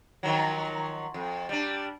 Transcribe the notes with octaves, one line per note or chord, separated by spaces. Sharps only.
D#3 F3 F#3
F2
G3 D4